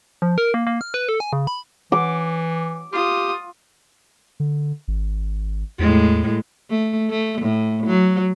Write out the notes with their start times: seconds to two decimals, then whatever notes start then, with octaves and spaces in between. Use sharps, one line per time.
0.22 F3
0.38 A#4
0.54 A#3
0.67 A#3
0.81 F6
0.94 B4
1.09 A4
1.20 G#5
1.33 C#3
1.47 B5
1.92 E3 D6
2.92 F4 G4 D#6
4.40 D3
4.88 G#1
5.79 E2 A2 G#3
6.70 A3
7.10 A3
7.41 A2
7.86 F#3